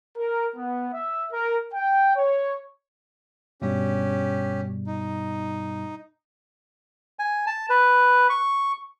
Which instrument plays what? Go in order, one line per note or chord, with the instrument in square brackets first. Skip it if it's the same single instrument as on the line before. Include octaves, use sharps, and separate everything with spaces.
[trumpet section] A#4
B3
E5
A#4
G5
C#5
[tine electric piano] G2 B2 G3 [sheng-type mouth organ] C#4 G4
[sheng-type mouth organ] D#4
[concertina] G#5
A5
B4
C#6